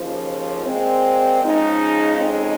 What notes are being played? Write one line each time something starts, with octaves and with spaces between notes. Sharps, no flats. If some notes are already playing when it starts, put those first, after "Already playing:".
Already playing: D#2 C#3 F3
A#2 G#3 C4
C#3 F3 G#3 D#4
F2 C#3 G#3 C4 D#4